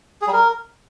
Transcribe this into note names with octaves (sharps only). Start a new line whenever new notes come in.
G#4
G3
A#4